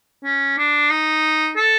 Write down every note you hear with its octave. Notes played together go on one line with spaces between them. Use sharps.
C#4
D4
D#4
A4